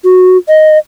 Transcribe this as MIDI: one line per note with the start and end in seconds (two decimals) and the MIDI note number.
0.04 0.37 66
0.48 0.78 75